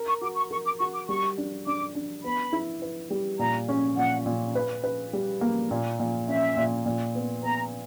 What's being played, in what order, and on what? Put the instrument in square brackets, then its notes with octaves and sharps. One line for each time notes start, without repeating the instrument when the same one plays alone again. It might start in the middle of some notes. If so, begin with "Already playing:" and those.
Already playing: [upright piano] A#4
[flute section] C#6
[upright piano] F#4 [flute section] D6
[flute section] C#6
[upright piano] A#4 [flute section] C#6
[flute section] D6
[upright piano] F#4 [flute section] C#6
[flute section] D6
[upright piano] G3 [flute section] C#6
[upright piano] D4
[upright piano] D4 [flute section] D6
[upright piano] D4
[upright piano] B3 [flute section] B5
[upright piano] E4
B4
G3
[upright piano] A#2 [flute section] A#5
[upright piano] C#4
[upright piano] A#2 [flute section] F#5
[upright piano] A#2
B4
B4
G3
A#3
A#2
A#2
[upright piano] C#4 [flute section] E5
[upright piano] A#2
A#2
B3
[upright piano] B3 [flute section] A#5